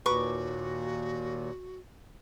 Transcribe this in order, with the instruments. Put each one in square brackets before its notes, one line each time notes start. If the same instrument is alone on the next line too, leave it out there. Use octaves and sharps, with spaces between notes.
[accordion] D#2 A#2 [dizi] F#4 [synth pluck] B4 A#5 B5 [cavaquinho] C#6 D6